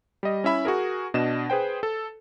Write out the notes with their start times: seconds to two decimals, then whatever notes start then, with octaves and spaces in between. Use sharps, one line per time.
0.23 G3 D#5
0.44 C#4 E4 E5 B5
0.65 F#4 G#4 A#4
1.14 B2 D4 D#5 E7
1.50 G#4 B4 C5 G5
1.83 A4